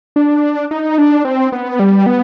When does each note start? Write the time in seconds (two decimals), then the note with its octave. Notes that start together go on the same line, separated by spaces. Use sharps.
0.16 D4
0.71 D#4
0.98 D4
1.25 C4
1.52 B3
1.80 G3
2.06 B3